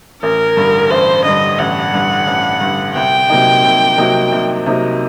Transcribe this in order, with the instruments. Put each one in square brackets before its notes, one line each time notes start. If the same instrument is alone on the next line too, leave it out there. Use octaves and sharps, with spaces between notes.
[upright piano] A1 [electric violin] A#4
[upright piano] G2 D3
[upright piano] A1 [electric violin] C5
[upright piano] G2 D3 [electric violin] D#5
[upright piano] A1 [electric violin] F#5
[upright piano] G2 D3
A1
G2 D3
[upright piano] C2 [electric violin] G5
[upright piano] C3 F#3 A#3 D#4
C2
C3 F#3 A#3 D#4
C2
C3 F#3 A#3 D#4